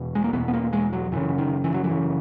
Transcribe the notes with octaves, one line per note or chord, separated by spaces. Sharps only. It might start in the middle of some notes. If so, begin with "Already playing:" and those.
Already playing: E2 B2
G#3
A#3
E2 B2 B3
B3
A#3
G#3
F#3
F#2 C#3 E3
D#3
E3
F#3
E3
F#2 C#3